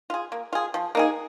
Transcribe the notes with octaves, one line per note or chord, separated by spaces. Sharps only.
F4 G#4
A#3
F4 G#4
F3
A#3 D#4 G#4